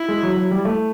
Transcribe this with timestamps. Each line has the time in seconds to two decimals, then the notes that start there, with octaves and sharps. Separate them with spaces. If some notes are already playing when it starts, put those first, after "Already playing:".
Already playing: E4
0.08 G#3
0.23 F#3
0.36 F#3
0.51 G3
0.65 A3